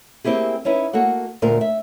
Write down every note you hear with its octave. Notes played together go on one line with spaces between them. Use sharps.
A#3 C4 E4 G4 G#4
C#4 D#4 E4 B4
A#3 F#4 A4 F#5
D2 A#2 A#4 C5
E5